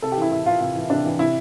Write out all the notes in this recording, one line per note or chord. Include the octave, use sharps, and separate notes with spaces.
C3 A4
G4
E3 E4
C3 E4
E3 F4
C3 F4
E3
C3 D4
E3
C3 E4